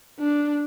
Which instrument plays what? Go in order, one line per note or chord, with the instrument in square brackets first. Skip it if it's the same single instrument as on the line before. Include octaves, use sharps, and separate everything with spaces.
[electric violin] D4